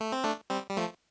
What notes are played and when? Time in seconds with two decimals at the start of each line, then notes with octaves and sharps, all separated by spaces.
0.01 A3
0.12 C4
0.24 A3 D4
0.50 G3 C4
0.69 G3
0.77 F3 A3